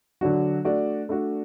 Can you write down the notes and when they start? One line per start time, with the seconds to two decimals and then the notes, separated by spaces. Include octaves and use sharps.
0.21 D3 F#3 D4 F#4
0.65 A3 D4 F#4 D5
1.09 A3 D4 F#4 D5